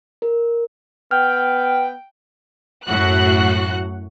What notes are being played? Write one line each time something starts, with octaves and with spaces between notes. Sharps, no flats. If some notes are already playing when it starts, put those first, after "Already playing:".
A#4
B3 G5 F6
F#2 A2 F#4 F#5 F#6